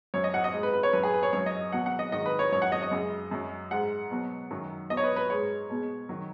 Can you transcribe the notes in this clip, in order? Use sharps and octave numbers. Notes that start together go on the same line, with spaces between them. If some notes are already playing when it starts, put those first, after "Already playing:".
F#2 F#3 C#5
D#5
F#5
D#5
G#2 G#3
B4
B4
C#5
F#2 F#3 B4
G#4
B4
C#5
F#2 F#3 C#5
D#5
B2 F#3 F#5
F#5
D#5
G#2 D#3 F#3 D#5
B4
C#5
F#2 F#3 C#5
F#5
D#5
D#5
F#2 C#3 G#3
F#2 F#3
G#2 G#3 F#5
B2 F#3
F#2 D#3 F#3
B2 F#3 D#5
C#5
B4
B4
G#2 G#3 C#5
B2 G#3
D#3 F#3